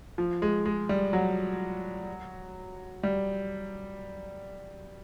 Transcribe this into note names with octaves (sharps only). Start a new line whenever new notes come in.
F3
G#3
G#3
G3
F#3
G3